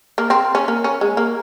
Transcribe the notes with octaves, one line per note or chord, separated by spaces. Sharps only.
A#3
C4
C#4
A#3
C#4
G#3
A#3